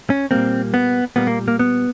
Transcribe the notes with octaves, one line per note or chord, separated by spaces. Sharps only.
C#4
A#2 G3 A#3 C4
B3
A#2 G3 A#3 B3
A#3
A#3
B3